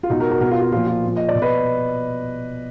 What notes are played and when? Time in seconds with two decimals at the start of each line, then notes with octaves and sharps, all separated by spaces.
0.03 F4
0.10 B2 D#4 F#4
0.20 F#4 A#4
0.30 F#4 A#4
0.41 B2 F#4 A#4
0.51 F4
0.62 F4
0.72 A#2 F3 F4
0.87 F4
1.03 A#2 F3
1.16 D#5
1.29 D5
1.35 B2
1.42 B4 D#5